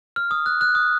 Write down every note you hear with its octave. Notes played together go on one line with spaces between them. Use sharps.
F6
D#6
F#6
F#6
D#6